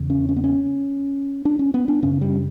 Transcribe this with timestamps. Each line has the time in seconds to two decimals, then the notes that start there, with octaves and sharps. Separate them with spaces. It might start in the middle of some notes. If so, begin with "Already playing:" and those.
Already playing: E2 C#3
0.10 C#4
0.29 C#4
0.36 B3
0.44 C#4
1.45 D4
1.59 C#4
1.74 B3
1.88 D4
2.03 F#2 C#3 C#4
2.21 G3